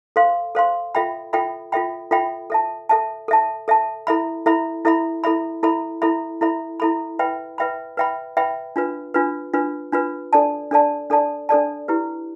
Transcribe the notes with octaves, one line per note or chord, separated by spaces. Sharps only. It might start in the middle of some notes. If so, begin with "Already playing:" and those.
A4 C5 F5 C6
A4 C5 F5 C6
F4 A4 E5 G5 B5
F4 A4 E5 G5 B5
F4 A4 E5 G5 B5
F4 A4 E5 G5 B5
A4 E5 A5
A4 E5 A5
A4 E5 A5
A4 E5 A5
E4 A4 E5 B5
E4 A4 E5 B5
E4 A4 E5 B5
E4 A4 E5 B5
E4 A4 E5 B5
E4 A4 E5 B5
E4 A4 E5 B5
E4 A4 E5 B5
B4 E5 G5 B5
B4 E5 G5 B5
B4 E5 G5 B5
B4 E5 G5 B5
D4 F4 B4
D4 F4 B4
D4 F4 B4
D4 F4 B4
D4 A4 D5 A5
D4 A4 D5 A5
D4 A4 D5 A5
D4 A4 D5 A5
E4 G4 B4